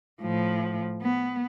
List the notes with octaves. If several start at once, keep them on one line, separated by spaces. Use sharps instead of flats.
A2 F3
B3